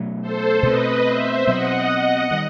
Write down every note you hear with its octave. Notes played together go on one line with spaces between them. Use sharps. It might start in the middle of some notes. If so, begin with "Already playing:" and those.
Already playing: B2 F#3 A3
A4 C5
B2 A3 C4 B4 D#5
C5 E5
B2 F#3 C4 D#5 F#5
D#3 G3